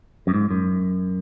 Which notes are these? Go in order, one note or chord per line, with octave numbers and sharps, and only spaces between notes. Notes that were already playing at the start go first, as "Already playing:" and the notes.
F#2
G#2
F#2